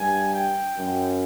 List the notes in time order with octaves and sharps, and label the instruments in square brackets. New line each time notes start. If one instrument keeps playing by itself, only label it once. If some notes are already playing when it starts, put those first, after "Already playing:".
Already playing: [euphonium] G2 [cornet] G#5
[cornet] G5
[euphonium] F#2 [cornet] G5